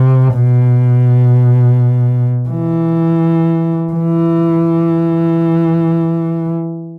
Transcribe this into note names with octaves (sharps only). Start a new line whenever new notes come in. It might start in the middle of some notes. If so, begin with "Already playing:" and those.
Already playing: C3
B2
E3
E3